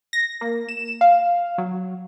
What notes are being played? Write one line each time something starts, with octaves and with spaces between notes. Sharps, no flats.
A#6
A#3
E7
F5
F#3